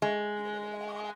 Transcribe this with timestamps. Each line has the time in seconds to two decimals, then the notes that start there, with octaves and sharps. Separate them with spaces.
0.02 G#3